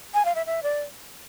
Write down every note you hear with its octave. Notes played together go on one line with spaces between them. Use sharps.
G#5
F5
E5
E5
D5